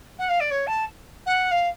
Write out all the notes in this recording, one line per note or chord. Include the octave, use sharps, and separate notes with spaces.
F#5
F5
D5
C#5
A5
F#5
F5